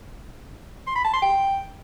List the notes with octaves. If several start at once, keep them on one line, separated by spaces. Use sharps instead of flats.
C6
B5
A5
C6
G5